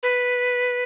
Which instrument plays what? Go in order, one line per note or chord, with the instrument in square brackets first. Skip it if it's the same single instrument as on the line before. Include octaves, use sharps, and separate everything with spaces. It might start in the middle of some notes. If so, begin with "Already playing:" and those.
[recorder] B4